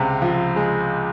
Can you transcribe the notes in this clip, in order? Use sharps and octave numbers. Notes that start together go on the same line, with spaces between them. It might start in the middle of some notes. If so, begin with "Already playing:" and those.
Already playing: C#2 C3 G#3
F3
G#3